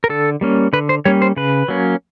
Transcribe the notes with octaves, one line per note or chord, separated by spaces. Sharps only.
A#4
D3 A4
G3 A#3 C#4
D3 B4
C5
G3 A#3 C#4 C#5
C5
C#3 B4
F#3 A#3 C#4